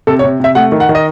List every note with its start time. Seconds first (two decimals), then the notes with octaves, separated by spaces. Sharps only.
0.07 C3 A4
0.19 C#5
0.24 C3
0.40 C3 E5
0.55 A3 F#5
0.72 D#3
0.80 F#5
0.89 D#3
0.95 D#5